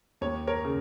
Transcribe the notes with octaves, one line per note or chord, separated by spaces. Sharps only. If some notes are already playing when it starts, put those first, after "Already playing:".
D#2 C#5
A#4 C#5
C#3